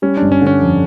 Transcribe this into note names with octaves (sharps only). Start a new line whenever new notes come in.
G3 C#4
G1 D4
C#4
D3
C#4
F2